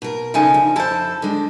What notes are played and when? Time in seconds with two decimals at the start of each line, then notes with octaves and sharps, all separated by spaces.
0.02 B2 A#4
0.34 C#3 F3 D#4 A4 G#5
0.54 D2
0.76 F2 E4 A4 C5 A5
1.22 D3 G#3